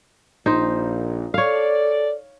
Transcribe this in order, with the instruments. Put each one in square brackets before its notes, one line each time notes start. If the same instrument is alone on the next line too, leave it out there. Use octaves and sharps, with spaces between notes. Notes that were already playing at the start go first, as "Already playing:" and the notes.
[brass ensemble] A#1 A#2 [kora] D#4 C5
[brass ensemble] A4 D5 [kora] C#5 F5